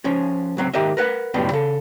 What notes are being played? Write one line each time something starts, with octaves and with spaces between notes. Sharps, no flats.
F3 C#4 G#4
C#2 F#3 C4
G#2 D#3 G4 A#4 D#5 E5
A#4 B4 F#5
C#2 F#2 A2 G3 G#3 B3
C#3 A4